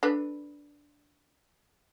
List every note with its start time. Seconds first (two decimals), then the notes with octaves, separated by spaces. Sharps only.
0.03 D4 A4 B4